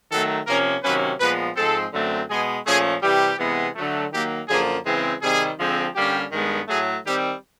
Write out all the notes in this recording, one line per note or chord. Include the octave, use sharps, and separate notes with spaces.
D#3 F#3 A3 A4
C3 F3 A#3 C#4 A#4
C3 D#3 F#3 A#3 C#4 B4
A#2 F3 G#3 B3 B4
G#2 F3 G#3 C4 A4
F#2 D3 F#3 A3 C4
B2 G#3 B3 G#4
A#2 F3 A3 C#4 G#4
C3 E3 G3 G4
C3 E3 G#3 B3
D3 F#3 A3
D#3 F#3 A#3 G4
F#2 D3 F3 A#3 G#4
C#3 E3 G#3 C4
C3 D#3 G3 C4 G#4
D3 F3 G#3 C4
D3 G3 A#3 C#4 G4
G2 D#3 G#3 B3
A2 F#3 A3 G#4
D#3 G3 C4 G4